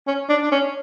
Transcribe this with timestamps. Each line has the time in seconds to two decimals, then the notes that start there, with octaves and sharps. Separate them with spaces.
0.07 C#4
0.29 D4
0.42 D4
0.52 C#4